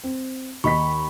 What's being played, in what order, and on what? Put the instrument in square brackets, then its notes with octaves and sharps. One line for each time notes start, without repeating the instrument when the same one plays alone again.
[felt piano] C4
[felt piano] D#2 D#5 B6 [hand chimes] B5 C#6